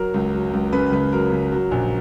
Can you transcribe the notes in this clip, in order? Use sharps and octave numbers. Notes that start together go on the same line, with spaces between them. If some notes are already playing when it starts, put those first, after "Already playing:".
Already playing: F#3 A#4
C#2
F#3
C#2
C#3 B4
C#2 B4
F#3 A#4
C#3
F#3
A#1